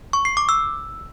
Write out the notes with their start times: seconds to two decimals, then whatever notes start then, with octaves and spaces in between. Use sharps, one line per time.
0.13 C#6
0.25 C7
0.37 D6
0.49 E6